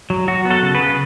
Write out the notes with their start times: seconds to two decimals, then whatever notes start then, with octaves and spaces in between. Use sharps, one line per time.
0.10 F#3
0.28 F#3 F#4
0.45 B3
0.50 F#4 A4
0.63 C#3
0.74 G#4 B4
0.80 C#3